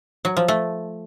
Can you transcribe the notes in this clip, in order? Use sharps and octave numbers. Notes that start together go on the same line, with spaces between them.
F#3
F3
A3